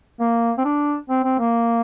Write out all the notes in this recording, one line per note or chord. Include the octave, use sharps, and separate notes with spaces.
A#3
C4
D4
C4
C4
A#3